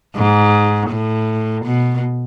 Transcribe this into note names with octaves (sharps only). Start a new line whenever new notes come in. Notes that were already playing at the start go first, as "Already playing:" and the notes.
G#2
A2
B2